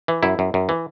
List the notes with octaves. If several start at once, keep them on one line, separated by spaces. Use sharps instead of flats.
E3
F#2 E4
F#2
F#2
E3